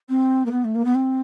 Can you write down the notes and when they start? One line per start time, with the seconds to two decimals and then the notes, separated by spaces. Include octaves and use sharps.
0.09 C4
0.45 A#3
0.51 B3
0.64 A3
0.75 A#3
0.85 B3
0.94 C4